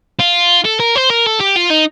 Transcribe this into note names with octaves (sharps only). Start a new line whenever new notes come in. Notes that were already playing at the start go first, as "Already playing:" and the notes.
F4
A4
A#4
C5
A#4
A4
G4
F4
D#4